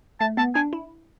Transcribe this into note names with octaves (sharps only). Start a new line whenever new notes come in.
A3 A5
B3 A5
D4 G#5
E4